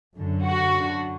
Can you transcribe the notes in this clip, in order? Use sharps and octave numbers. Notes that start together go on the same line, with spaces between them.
F#2 D3
F#4
F#2 D3